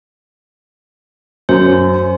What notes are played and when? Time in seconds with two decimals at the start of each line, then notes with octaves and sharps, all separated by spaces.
1.49 F#2 C5